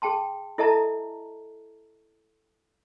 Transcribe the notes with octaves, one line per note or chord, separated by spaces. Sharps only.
G#4 G5 A5 C6
E4 A4 D#5 E5 A5 A#5